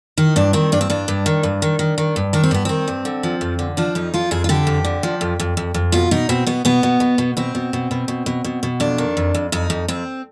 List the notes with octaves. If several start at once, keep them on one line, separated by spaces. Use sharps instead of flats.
D#3 D#4
G2 D4
D#3 C4
G2 D4
C4
G2 D4
G2
D#3
G2
D#3
D#3
D#3
G2
D#3 D4
C4
G2 B3
D#3 C4
G2
D3
F3
F2
D3
F3 D4
F2 D#4
F3 F4
F2 G#4
F4
D3 G4
F2
D3
F3
F2
F2
F2
F2
B2 F4
B2 D#4
B2 C4
B2 B3
B2 B3
B2
B2
B2
B2 C4
B2
B2
B2
B2
B2
B2
B2
F2 D4
D#3
F2
F2
F2 D#4
F2
F2 C4